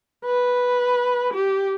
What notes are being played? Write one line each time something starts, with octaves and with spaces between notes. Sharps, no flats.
B4
G4